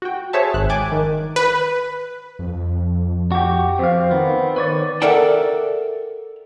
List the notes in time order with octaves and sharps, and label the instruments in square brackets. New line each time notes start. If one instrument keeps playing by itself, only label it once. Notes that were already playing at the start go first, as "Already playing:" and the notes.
[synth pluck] F#4 G5
G#4 C5 C#5 E5 A5
G#1 F#6
G5 G#5 D6 F#6 G#6 A6
D#3
[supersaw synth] B4
[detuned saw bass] F2
[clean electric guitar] F#4 G4
[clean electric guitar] F2 F5 [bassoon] C4
[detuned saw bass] D#3 [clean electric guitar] B3
[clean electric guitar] B4 C#5 D5
[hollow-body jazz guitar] A4 A#4 D5 E5 F#5 G5